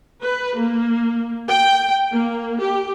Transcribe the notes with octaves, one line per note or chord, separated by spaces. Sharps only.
B4
A#3
G5
A#3
G4